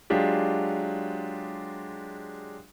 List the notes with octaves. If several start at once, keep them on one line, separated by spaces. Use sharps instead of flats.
F#3 G#3 D4 F4 G4